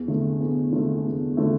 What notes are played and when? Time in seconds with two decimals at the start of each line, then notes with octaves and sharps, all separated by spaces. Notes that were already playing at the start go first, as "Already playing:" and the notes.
Already playing: E2
0.08 D3 A3
0.40 E2
0.73 D3 A3
1.05 E2
1.37 D3 A3